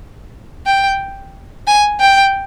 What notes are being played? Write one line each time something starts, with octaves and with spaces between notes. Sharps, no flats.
G5
G#5
G5